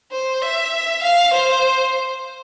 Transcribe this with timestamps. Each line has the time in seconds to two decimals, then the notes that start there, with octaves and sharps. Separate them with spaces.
0.12 C5
0.42 E5
1.02 F5
1.34 C5